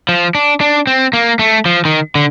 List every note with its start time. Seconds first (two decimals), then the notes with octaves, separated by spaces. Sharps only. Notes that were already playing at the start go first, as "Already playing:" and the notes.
0.09 F3
0.35 D4
0.61 D4
0.87 C4
1.13 A#3
1.39 A3
1.66 F3
1.85 D#3
2.15 D3